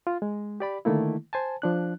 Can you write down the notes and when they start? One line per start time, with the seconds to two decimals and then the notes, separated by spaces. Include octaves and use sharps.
0.07 F4
0.22 G#3
0.60 G4 D5 B5
0.85 D3 D#3 A3 A#3 E4
1.33 C5 G#5 A5
1.62 F3 D4 F#6